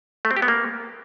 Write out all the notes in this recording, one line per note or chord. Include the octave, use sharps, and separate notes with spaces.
A3
C4
G4
B3
A#3